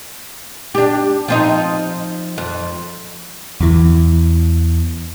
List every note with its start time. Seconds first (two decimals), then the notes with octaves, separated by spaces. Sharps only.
0.75 D4 G4
1.28 F3 C4 D#4
2.38 F2
3.60 E2 E3